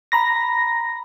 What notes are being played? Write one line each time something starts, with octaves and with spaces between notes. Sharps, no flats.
A#5 B5 A#6